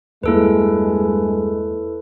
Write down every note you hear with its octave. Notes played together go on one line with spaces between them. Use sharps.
E2 G2 G#3 A#3 E4 A4 B4